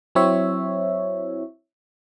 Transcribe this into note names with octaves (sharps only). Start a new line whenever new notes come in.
F#3 C4 E4 C#5 E5